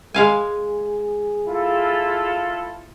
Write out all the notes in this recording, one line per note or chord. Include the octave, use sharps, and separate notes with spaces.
G#3 G#4 F5 G#5
E4 F4 A4